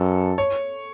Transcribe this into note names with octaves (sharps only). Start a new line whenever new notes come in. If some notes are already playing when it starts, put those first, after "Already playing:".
Already playing: F#2 A4
C#5